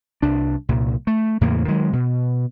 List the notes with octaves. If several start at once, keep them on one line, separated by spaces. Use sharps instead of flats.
C2 D4
C2 A#2
A3
E2 A2 C#3 A#3
D#3 F#3 G#3
B2